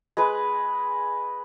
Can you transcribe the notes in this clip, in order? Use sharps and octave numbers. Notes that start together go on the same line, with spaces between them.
G#3 B4